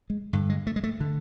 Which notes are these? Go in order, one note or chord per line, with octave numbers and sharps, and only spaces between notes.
G#3
G2 D3
G#3
A3
G#3
A3
D3